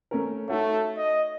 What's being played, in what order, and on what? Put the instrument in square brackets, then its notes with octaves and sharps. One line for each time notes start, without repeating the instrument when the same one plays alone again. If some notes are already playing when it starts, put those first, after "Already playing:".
[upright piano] A3 C#4 A#4
[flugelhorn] A3 [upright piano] D#4 F#4 C#5
[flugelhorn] D#5